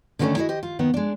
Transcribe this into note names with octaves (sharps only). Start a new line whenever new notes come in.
D3 D#3 A3 A#3 C#4 D4
E4 F#4 G#4 C#5 D#5
G4 C5 D#5
F4
D#2 D#3 B3
G#3 D4